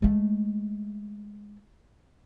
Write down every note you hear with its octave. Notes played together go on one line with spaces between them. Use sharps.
G#3 A3